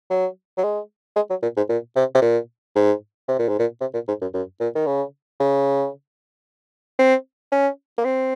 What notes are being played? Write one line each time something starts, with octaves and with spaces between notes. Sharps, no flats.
F#3
F#3
G#3
G#3
F#3
A#2
G#2
A#2
C3
C3
A#2
G#2
C3
A#2
G#2
A#2
C3
A#2
G#2
F#2
F#2
A#2
D#3
C#3
C#3
C4
C#4
A#3
C4